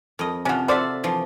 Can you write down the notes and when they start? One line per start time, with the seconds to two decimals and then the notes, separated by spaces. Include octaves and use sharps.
0.19 F2 D#5
0.45 C3 F3 C#4 F#4
0.68 F4 F#4 A4 C5 D5 E5
1.03 E3 F3